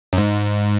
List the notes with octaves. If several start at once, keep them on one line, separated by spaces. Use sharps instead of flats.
F#2
G#2